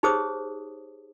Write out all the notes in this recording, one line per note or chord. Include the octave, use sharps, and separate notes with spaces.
D#4 G4 G#4 C5 C#5 D#6